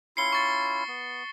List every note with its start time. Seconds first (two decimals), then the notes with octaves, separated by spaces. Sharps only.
0.17 C#4 E4 F4 C7 C#7 G7
0.33 C#6 A6 C#7
0.88 B3